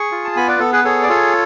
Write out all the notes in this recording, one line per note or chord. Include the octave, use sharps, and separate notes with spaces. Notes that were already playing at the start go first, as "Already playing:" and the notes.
Already playing: G#4 C#6
F4
A5
B3 G#5 B5
B4 D5
B3 A4
G#4 B4
G#4 A4 C#5
D5
F4 A4 C#5